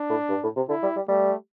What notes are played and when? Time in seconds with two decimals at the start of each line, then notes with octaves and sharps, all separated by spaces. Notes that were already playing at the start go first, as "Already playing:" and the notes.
Already playing: D4
0.10 A2
0.29 G2
0.43 A2
0.56 C3
0.69 D3 E4
0.83 G3
0.96 G3
1.08 G3 A3